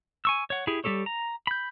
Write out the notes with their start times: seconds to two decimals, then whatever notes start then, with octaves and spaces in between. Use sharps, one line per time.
0.25 G#5 C#6 E6
0.50 C#5 F#5
0.67 E4 G4 G#4
0.84 G3 C#4 G4 A4 C#5
1.06 A#5
1.47 B5 G6